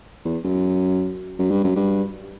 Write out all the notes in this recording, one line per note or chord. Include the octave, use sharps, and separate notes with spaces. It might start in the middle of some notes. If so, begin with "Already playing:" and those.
E2
F#2
F#2
G2
F#2
G2